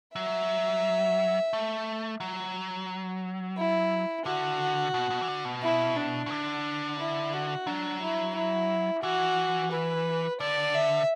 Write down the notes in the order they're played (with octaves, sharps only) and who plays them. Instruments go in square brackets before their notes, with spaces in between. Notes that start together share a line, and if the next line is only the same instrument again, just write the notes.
[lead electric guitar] F#3 [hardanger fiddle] E5
[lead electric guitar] A3
F#3
[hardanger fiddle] E4
[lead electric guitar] D3 [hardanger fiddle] F#4
[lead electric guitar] B2
B2
E3
D3
B2
[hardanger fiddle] E4
D4
[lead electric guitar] B2
D3
[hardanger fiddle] E4
F#4
[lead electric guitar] F#3 [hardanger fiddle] D4
[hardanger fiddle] E4
E4
[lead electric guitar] E3 [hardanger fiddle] F#4
[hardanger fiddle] B4
[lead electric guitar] D3 [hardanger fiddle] D5
[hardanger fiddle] E5